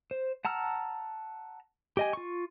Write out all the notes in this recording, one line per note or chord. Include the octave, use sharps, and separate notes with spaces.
C5
F#5 A5 A#5 E6 F6
G4 D#5 G#5
F4 C#6